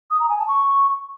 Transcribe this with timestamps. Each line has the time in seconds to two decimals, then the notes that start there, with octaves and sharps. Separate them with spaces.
0.10 D#6
0.20 A#5
0.29 G#5
0.39 A5
0.48 C#6